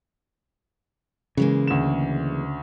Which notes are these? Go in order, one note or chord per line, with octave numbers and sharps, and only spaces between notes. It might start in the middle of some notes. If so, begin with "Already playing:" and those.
C#3 E3 G#3 A#3
D2 E7